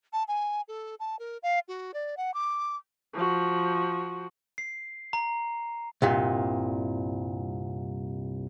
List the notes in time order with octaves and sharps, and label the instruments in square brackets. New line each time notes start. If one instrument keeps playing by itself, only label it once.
[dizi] A5
G#5
A4
A5
A#4
F5
F#4
D5
F#5
D6
[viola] F3 F#4
[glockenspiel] C7
A#5
[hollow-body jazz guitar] C2 G2 A#2